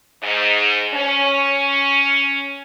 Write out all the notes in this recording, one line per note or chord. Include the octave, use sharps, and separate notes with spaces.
G#2
C#4